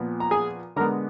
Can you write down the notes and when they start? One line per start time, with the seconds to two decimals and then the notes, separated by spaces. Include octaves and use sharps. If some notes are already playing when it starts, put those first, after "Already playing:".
Already playing: A#2 F3 B3
0.20 A#5
0.31 G#4 G#5
0.76 D3 G#3 B3 A#4 A#5